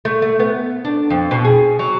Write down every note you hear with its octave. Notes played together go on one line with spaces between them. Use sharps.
A3
A3
B3
D4
F2
B2
G#4
F#3